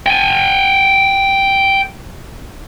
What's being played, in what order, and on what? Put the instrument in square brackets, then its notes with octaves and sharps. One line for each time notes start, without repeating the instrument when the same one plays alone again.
[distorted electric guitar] G5 G#5